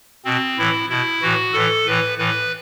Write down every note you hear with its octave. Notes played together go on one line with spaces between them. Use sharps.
B2 C4
A2 E3 E4
B2 E4
A2 E3 F#4
A2 E3 A4
A2 E3 B4
A2 E3 B4